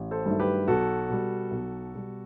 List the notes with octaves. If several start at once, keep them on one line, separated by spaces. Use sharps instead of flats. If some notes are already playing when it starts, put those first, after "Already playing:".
Already playing: A1
A4 C5
G2 D#3 F#3 A3
G4 B4
B1 F#4 A4
B2 G3
B1
B2 G3